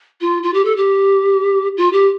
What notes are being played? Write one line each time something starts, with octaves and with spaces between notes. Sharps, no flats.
F4
F4
G4
A4
G4
F4
G4